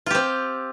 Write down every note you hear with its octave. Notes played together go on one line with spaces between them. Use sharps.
C4 F4 G4